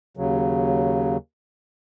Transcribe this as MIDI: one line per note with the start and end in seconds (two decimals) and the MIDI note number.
0.17 1.17 39
0.17 1.17 49
0.17 1.17 54